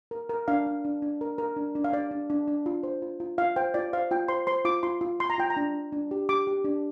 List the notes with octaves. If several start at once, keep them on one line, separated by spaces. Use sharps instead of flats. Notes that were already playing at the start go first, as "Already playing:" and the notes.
A#4
A#4
D4 F5
D4
D4
D4
A#4
A#4
D4
D4
F5
D4 D5
D4
D4
D4
F4
C5
F4
F4
F4 F5
C5 G5
F4 D5
C5 F5
F4 G5
C5 C6
C5 C6
F4 D6
F4 C6
F4
F4 C6
A#5
F4 G5
A#5
D4
D4
D4
G4
G4 D6
G4
D4